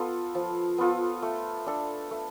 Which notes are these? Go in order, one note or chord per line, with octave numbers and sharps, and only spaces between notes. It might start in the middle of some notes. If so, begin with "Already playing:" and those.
Already playing: B3 F4 A4
F3
B3 F4 A4
A3
D4 A4
A3